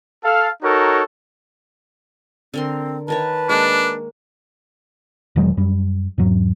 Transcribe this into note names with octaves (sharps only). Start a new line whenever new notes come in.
A4 F5
D#4 F#4 A4 A#4 C#5
D3 C4 A#4 C6
D#3 A#4 B4 C#5 A5
G#3 A#3 D4
E1 D#3 F#3 G#3
F#2 G3
E2 G#2 F#3